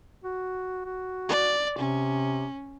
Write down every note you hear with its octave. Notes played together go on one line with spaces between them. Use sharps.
F#4
F#4
D5
C3 C#4